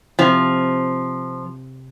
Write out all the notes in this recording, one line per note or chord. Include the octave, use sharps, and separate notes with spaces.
C3 F3